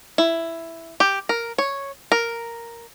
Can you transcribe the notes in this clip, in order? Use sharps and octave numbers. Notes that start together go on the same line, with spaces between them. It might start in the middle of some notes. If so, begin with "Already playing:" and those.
E4
G4
A#4
C#5
A#4